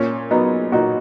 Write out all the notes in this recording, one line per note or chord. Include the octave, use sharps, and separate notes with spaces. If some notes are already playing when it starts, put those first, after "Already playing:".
Already playing: A#2 C#4
F#3 B3 D#4
A#2 D#4 F#4